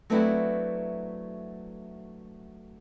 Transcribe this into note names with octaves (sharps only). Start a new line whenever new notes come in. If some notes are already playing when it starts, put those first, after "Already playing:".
F#3 A3 B3 C4 D4 E4